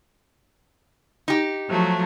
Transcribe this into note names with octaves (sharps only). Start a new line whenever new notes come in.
D#4 G4
F3 F#3 A3